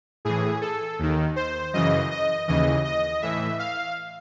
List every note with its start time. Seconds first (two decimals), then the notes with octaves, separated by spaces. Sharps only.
0.25 A2 E3 G#4
0.61 A4
0.99 D#2 D#3
1.36 C5
1.73 F#2 C#3 E3 D#5
2.11 D#5
2.48 D#2 C#3 E3 D#5
2.85 D#5
3.22 A2 E3 E5
3.59 F5